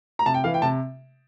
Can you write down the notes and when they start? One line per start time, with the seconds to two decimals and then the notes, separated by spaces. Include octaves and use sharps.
0.19 A#5
0.26 C3 A5
0.34 G5
0.44 E3 F5
0.54 G5
0.62 C3 A5